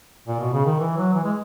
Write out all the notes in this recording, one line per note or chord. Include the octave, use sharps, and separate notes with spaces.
A#2
B2
C#3
D#3
E3
F#3
E3
G#3